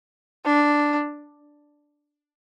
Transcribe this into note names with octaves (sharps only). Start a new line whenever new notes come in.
D4